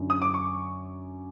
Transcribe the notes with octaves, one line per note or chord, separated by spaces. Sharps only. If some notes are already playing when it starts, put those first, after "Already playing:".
Already playing: F#2 D3
D#6
D6
C#6